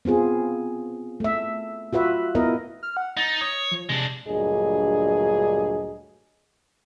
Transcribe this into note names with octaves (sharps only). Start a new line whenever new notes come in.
B3 C4 F4 G#4
A3 E5
F4 F#4 B4 E5
B3 E4 A#4 D#5
F6
F#5
D#4 A6
C#5 D#6
F3
C3 G#3 D4
D2 G2 A#2 F#3 G#4 D#5